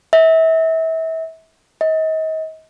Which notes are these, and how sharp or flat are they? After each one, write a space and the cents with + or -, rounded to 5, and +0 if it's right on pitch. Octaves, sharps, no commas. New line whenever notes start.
E5 -30
D#5 +35